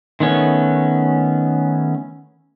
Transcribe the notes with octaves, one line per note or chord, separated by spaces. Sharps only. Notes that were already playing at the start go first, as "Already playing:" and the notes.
D#3 A3 B3 C#4